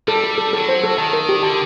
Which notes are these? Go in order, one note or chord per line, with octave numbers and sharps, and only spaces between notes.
G3 A4
A4
A4
F#3 A4
C5
A4
D#3 A5
A#4
G4
D3 A5